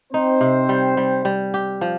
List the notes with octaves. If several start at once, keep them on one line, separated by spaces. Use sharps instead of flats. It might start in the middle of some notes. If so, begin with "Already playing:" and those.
C4 D#4 C5
C3
G3
G3
G3
G4
F3